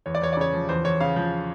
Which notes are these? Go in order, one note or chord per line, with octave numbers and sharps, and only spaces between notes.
E2 C#5
D5
E2 C#5
D5
C#3 C#5
F3
E2 C5
E2 C#5
C#3 F5
F3